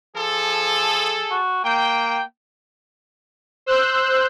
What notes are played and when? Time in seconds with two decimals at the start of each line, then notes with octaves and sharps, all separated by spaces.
0.16 F3 G#4 A4
1.31 F#4
1.65 A#3 G5
3.66 C5 E6 F#6 G6